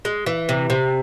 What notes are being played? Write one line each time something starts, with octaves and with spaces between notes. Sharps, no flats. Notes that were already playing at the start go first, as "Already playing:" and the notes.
G#3
E3
C3
C3